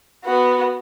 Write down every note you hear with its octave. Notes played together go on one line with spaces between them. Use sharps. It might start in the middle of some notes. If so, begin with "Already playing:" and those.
B3 F#4